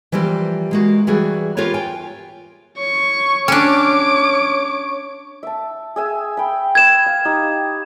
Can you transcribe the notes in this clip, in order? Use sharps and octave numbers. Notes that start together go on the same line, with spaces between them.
E3 F3 G3 A#3 G4
G#3 A#3 F#4
E3 G3 F#4 G#4
F4 G4 A#4 B4 C#5
G5 G#5
C#5 C#6
C#4 D4 D6
E5 A5
G#4 E5 G#5
G5 B5
B4 D#6 G#6 E7
F5
D#4 G4